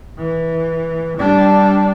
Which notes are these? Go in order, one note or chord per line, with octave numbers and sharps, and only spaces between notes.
E3
G3 D4